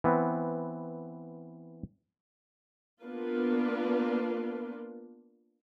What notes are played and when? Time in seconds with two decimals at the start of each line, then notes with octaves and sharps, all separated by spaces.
0.04 E3 B3 C4
3.02 A#3 B3 D4 F4 A#4 B4